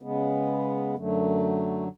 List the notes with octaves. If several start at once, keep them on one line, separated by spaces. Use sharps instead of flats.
C#3 G#3 B3
F#2 D3 F#3 A3